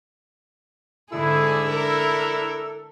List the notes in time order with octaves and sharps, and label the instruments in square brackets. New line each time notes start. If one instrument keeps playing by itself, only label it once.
[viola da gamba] G#2 D3 G#4 [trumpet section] D4 E4 [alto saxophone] A4
[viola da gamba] A#4